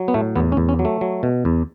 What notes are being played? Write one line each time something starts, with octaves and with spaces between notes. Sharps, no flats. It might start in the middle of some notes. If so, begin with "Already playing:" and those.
Already playing: F#3
B3
A2 A3
E2 B3
C#4
E2
C#4
F#3
A3
F#3
B2
E2